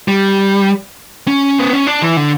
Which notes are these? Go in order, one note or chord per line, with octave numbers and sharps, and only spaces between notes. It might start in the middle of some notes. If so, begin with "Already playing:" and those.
G3
C#4
B3
C#4
D4
E3
D3